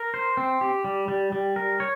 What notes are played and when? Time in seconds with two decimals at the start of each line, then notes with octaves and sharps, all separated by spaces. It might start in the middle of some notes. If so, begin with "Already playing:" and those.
Already playing: A#4
0.14 C5
0.37 C4
0.61 G4
0.85 G3
1.08 G3
1.32 G3
1.56 A#4
1.80 C#5